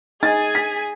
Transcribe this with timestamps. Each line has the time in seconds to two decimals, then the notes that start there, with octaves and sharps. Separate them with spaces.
0.23 D#4 G#4 G#5 A6
0.55 B6